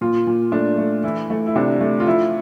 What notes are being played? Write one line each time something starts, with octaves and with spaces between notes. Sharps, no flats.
A#2 F4
A#2
A3 D4
A3
E3 E4
A3
E4
C3 D4
A3
F4
F3 E4